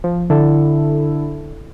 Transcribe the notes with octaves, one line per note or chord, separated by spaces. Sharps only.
F3
D3 E4 A4